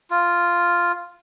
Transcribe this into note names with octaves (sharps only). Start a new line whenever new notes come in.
F4